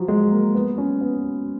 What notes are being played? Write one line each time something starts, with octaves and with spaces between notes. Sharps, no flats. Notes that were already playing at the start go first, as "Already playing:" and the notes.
Already playing: F3 F#3
G#3
A#3
B3
C#4
B3